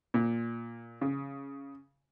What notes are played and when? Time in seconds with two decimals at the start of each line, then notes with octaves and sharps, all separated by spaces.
0.14 A#2
1.01 C#3